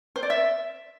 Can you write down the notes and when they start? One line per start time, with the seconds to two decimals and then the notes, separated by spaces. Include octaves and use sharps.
0.16 C5
0.23 D5
0.30 E5